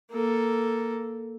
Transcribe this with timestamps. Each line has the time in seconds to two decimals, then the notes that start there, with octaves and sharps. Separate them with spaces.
0.12 A#3 A4